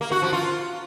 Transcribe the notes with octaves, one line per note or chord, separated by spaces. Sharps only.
A#3
F#4
F3
F4